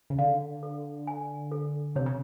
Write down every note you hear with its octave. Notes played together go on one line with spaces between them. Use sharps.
C#3
D3 F5
A4
G#5
A4
C3 C#5
C#3